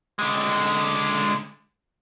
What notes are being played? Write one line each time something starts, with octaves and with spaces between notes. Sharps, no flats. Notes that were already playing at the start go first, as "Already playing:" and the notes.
D3 G#3